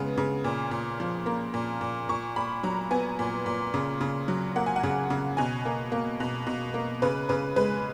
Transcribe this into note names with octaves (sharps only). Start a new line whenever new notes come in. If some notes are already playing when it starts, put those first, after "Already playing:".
Already playing: C#3 G#3 B3
C#3
A#2
A#2
F3
A#3
A#2
A#2
A#2 C#6
A#2 B5
F#3 A#5
B3 G#5
A#2
A#2
C#3
C#3
F#3
A#3 F#5
G#5
F#5
C#3
C#3
B2 G#5
A#3
A#3
B2
B2
A#3
C#3 B4
C#3 B4
G#3 B4